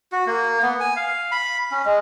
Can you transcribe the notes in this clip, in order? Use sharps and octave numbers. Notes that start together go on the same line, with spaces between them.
F#4
A#3
B3
G#5
F5
B5
C#4
G#3